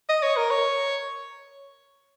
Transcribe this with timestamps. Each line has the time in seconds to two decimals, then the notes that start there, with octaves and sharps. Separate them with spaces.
0.09 D#5
0.23 C#5
0.37 A#4
0.51 C#5